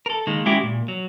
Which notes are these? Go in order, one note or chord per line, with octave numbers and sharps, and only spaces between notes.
A4 A#4
D#3 G#3 A#3
G#3 C#4 E4 F#4 G4
A#2
F#3